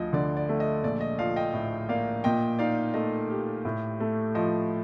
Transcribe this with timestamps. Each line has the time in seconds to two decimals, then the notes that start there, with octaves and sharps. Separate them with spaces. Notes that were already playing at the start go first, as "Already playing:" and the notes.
Already playing: D2 F3 D#5
0.13 D3 D5
0.37 D5
0.49 A3
0.60 D#5
0.83 A#1 D5
1.01 D#5
1.18 F3 D5 F5
1.36 D#5 G5
1.54 A2
1.89 A#3 D5 F5
2.24 A#2 D#5 G5
2.59 D#4 D5 F5
2.94 A3 D#5
3.30 G4
3.65 A2
4.00 A3
4.35 F3 D#5